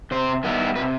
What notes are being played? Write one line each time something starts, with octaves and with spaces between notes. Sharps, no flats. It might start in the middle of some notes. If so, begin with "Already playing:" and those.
C3 C5
D#3 G3 B3 E4
C3 B4